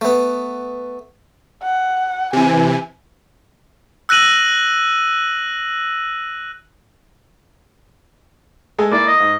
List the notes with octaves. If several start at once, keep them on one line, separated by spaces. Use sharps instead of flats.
A3 B3
F#5
C3 E3 G#5
E6 F#6 A#6 D#7 F#7
G#3 A4 G#5
A#3 E4 D5
D#5
G#2